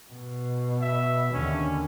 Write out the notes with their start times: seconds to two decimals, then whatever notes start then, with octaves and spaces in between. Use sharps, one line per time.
0.11 B2
0.81 E5
1.33 D#2 D3 C#4